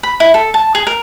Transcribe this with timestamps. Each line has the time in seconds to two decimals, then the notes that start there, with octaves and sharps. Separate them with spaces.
0.03 B5
0.20 E4
0.34 A4
0.54 A5
0.75 G#4
0.87 A#4